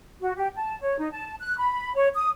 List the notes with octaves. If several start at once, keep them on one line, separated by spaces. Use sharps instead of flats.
F#4
G4
A5
C#5
D#4
A5
F#6
B5
C#5
D#6